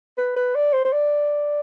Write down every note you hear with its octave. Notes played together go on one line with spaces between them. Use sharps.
B4
B4
D5
C5
C5
D5